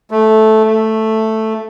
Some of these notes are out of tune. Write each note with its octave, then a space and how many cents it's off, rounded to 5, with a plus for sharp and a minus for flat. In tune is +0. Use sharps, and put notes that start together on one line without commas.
A3 -10
A3 +0